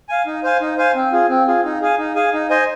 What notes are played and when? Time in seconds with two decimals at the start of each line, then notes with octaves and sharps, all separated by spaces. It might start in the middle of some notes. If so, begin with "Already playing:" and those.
0.09 F5 G#5
0.26 D#4
0.43 C5 F5 G#5
0.61 D#4
0.78 C5 F5 G#5
0.95 C4
1.12 F4 G#4
1.30 C4
1.47 F4 G#4
1.65 D#4
1.81 G#4 F5 G#5
1.98 D#4
2.15 G#4 F5 G#5
2.33 D#4
2.50 C5 D#5 G#5